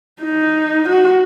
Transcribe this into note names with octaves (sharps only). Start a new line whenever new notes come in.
D#4
F#4